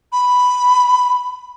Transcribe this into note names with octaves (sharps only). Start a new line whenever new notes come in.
B5